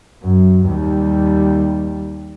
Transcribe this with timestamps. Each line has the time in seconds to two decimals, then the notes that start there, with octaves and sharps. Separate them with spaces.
0.23 F#2
0.67 D#2 G3